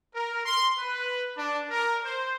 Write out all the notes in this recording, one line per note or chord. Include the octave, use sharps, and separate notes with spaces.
A#4
C6
B4
D4
A#4
C5